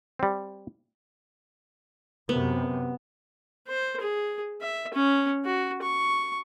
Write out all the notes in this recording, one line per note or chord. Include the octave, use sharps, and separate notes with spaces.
G3 C4
F#2 C3 B3
C5
G#4
E5
C#4
F#4
C#6